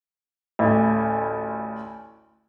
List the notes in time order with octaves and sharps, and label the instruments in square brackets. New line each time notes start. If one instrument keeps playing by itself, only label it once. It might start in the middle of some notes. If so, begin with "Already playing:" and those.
[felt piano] A1 D2